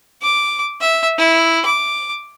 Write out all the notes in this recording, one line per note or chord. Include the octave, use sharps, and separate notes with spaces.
D6
E5
E4
D6